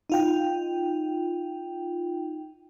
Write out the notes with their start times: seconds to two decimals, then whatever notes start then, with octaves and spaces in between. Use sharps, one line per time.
0.10 D#4 F4 G5